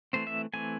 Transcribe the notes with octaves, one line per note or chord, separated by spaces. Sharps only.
E3 A3 C4 C5
E5
E3 A3 C4 G#5